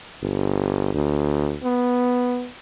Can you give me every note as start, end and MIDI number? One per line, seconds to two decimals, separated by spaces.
0.21 0.90 31
0.94 1.55 38
1.64 2.48 59